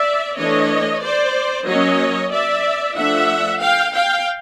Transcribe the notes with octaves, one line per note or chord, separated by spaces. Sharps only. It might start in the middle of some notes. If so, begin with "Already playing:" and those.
Already playing: D5 E5
E3 A3 D4 C#5 D#5
C5 D5
F#3 A#3 C#4 C#5 D#5
D5 E5
F3 A3 D4 E5 F#5
F5 G5
F5 G5